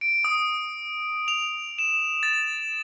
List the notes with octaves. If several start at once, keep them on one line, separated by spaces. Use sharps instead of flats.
D7
D#6
F7
E7
A6